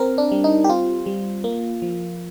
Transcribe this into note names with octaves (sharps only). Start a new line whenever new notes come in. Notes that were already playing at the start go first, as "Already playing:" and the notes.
Already playing: C4 A#4
D4
G3
D#4
G4
C4 F4
G3
A#3
F3